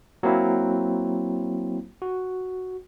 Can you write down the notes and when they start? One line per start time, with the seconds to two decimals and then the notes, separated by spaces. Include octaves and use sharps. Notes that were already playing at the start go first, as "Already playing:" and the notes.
0.23 F#3 A#3 C4 E4
2.02 F#4